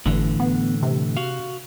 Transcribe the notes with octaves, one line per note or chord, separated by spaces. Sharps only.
G1 A2 D3 E3
B3
C3
F#4 F5